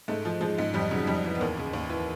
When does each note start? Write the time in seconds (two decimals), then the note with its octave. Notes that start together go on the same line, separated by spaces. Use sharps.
0.08 G#2 A3
0.25 F3
0.41 F3 G#3
0.58 G#2
0.74 F2 G3
0.91 C#3 F#3
1.07 F2 G3
1.24 E3
1.35 B3
1.41 D#2 A#3
1.57 C#3
1.73 D#2
1.89 E3